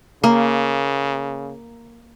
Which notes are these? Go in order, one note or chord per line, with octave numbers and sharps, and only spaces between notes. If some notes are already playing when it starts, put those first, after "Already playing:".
C#3 A#3